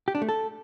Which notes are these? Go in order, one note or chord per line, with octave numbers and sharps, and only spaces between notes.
G4
D4
A3
A4